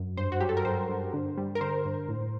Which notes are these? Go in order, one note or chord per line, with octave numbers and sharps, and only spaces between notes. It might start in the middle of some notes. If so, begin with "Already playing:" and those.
Already playing: F#2
G2 C5
F#4
F#3 G4
A4
A#4
G2 C5
G2
D3
G3
A#4
D3 C5
G2
A2